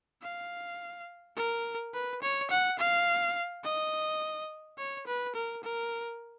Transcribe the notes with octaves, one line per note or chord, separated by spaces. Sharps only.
F5
A#4
B4
C#5
F#5
F5
D#5
C#5
B4
A#4
A#4